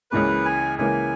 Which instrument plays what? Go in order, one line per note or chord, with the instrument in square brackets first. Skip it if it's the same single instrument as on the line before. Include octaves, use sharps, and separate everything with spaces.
[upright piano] C#2 C#3 E3 A#3 [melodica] B4
[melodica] G#5
[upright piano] C#2 C#3 E3 A#3 [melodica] G#5